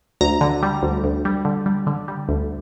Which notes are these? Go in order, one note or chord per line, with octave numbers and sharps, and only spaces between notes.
D2 A#5
D3
G3
D2
D2
G3
D3
G3
D3
G3
D2